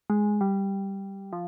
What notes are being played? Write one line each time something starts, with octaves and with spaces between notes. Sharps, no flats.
G#3
G3
F3